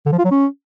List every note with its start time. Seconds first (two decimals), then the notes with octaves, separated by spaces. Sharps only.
0.06 D3
0.12 F3
0.19 F4
0.25 F#3
0.31 C#4